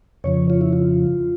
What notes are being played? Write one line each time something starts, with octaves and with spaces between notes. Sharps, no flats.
F2 C#3 F3 C#5
F4
E4
F4